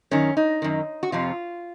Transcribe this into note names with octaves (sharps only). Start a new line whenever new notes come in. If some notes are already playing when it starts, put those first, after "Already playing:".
F#2 D#3 C#4
D#4
F#2 D#3
F#4
F2 C3 F3 F4